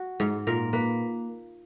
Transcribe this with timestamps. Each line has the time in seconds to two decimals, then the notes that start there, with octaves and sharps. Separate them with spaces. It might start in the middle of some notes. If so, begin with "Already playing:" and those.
Already playing: F#4
0.20 G#2
0.47 A#2 A#4
0.73 A#3 B4